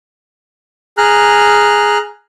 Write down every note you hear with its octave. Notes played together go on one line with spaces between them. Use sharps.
G#4 A#5 F6 F#6